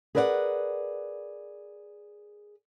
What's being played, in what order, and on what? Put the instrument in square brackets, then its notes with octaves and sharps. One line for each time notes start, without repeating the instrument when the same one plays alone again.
[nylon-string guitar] G#4 A#4 B4 D5 E5 F#5